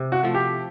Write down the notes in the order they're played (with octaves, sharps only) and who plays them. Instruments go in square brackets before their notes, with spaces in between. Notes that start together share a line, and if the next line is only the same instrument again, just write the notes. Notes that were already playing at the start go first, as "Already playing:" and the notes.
Already playing: [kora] C3
[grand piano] F#4
[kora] F3 A3
[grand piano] G4